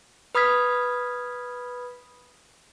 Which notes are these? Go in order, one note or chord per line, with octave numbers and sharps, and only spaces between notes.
B4 B5 D#6 F6 G#6 B6